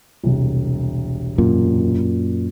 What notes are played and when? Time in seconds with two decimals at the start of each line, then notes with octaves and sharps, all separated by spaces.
0.24 E1 C2
1.38 F#2 A#2